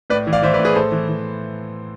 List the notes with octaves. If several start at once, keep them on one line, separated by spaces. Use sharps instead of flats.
A2 B4 D5
E3
D5 F5
E3 C5 E5
B4 D5
A2
G#4 B4
A2 A4 C5
E3
E3